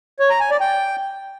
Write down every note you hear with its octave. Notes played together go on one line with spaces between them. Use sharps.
C#5
A#5
G#5
D5
G5